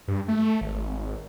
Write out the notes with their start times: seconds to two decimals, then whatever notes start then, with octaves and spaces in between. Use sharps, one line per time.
0.08 G2
0.28 A3
0.61 G#1